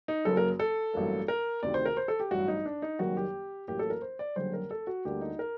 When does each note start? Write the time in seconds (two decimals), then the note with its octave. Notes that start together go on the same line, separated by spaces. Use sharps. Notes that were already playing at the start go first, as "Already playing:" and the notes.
0.08 D#4
0.25 F#1 F#2 F#3 A#3 A4
0.37 A#4
0.59 A4
0.94 A1 G2 F#3 A#3
1.28 A#4
1.63 D2 C3 D#3 D5
1.74 C5
1.86 A#4
1.97 C5
2.08 A4
2.20 G4
2.31 A1 G2 F#3 F#4
2.48 D#4
2.66 D4
2.82 D#4
2.99 F#1 F#2 D#3 G3 A#3 F#4
3.17 G4
3.68 A1 A2 F#3 A#3 G4
3.79 A4
3.90 A#4
4.02 C5
4.19 D5
4.36 F#1 F#2 D3 G3 C5
4.53 A#4
4.71 A4
4.87 F#4
5.05 D2 D3 G3 A#3 G4
5.21 D#4
5.39 A#4